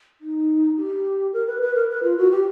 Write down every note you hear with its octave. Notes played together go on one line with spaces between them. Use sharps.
D#4
G4
A#4
B4
B4
A#4
B4
F4
F#4
G4